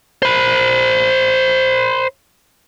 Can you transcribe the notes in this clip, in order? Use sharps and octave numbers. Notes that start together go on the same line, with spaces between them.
C5 B5